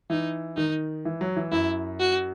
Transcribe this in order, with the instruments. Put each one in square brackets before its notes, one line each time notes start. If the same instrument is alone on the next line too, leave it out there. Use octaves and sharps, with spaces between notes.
[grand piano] E3 [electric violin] D#4
[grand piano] D#3 [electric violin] D#4
[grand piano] E3
F#3
E3
[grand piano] F#2 [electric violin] E4
[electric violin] F#4